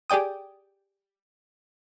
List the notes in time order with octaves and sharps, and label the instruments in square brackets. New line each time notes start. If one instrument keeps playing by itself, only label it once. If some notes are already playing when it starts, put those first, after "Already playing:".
[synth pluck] G4 G#4 D5 G5 D#6